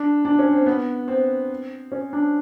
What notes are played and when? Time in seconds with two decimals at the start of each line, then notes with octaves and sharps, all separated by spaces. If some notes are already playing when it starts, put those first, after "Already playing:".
Already playing: D4
0.25 D4
0.39 C#4
0.52 C4
0.66 B3
1.08 C4
1.92 C#4
2.13 D4